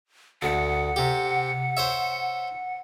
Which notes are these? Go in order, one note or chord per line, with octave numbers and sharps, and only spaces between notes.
D2 F#5
C3 G4
C5 C#5 E5